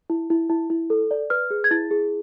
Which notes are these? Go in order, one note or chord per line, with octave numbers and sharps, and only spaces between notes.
E4
E4
E4
E4
A4
D5
B4 F6
G#4
G#6
E4 A6
G#4